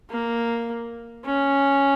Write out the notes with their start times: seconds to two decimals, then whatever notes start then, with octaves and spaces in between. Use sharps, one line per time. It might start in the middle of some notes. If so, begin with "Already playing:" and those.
0.11 A#3
1.25 C#4